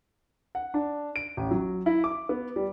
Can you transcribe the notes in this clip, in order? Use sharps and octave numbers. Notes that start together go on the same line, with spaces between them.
F#5
D4
D7
A1
F#3
E4
D6
B3
G3